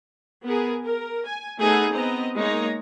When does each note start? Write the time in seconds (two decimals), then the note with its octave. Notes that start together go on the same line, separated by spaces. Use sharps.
0.45 B3 G#4 A#4
0.82 A#4
1.25 G#5
1.59 A3 B3 D#4 G#4 A4 F#5
1.92 B3 C4 D#5 A#5
2.36 G#3 A#3 D#4 C#5 A#5